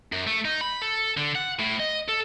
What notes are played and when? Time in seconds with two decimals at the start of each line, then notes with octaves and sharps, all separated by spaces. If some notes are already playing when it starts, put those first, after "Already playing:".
0.12 F#2
0.27 A3
0.45 D#4
0.61 B5
0.82 A4
1.17 D3
1.35 F#5
1.59 A2
1.80 D#5
2.09 A4